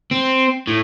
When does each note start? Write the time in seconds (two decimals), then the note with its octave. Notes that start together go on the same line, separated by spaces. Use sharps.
0.11 C4
0.67 A2